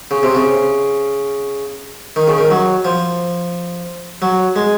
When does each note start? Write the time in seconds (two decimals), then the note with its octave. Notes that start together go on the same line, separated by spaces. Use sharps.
0.11 C#3
0.23 C3
0.35 C#3
2.16 D#3
2.27 C#3
2.38 D#3
2.50 F#3
2.85 F3
4.22 F#3
4.56 G#3